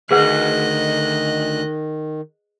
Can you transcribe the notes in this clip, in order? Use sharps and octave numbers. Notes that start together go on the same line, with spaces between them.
D2 D#3 G#4 B4 D#5 F#5 F#6